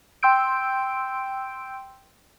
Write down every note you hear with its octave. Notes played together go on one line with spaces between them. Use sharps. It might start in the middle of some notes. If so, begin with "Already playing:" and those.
G5 C6 E6 G6 D7